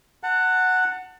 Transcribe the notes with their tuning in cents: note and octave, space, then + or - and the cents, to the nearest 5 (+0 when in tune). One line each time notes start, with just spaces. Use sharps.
F#5 +0 A5 +35